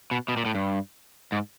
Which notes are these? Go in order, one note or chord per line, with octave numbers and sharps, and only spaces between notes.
B2
B2
A#2
A2
G2
G#2